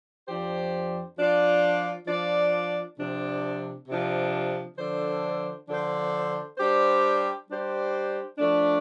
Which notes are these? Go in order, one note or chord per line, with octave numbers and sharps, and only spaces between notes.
F2 F3 D4 G4 C5
F3 D4 F4 D5
F3 D4 F4 D5
C3 F3 D4
C3 F3 D4
D3 F3 D4 A4 C5
D3 F3 D4 A4 C5
G3 D4 G4 C5
G3 D4 G4 C5
F3 A3 D4